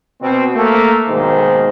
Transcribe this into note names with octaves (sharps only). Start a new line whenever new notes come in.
B2 C4
A3 A#3
B1 G#2 D#3 A#3 C5